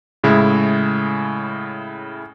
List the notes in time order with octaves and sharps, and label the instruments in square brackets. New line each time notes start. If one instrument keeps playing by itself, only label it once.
[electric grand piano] A2 C#3 G#3 E4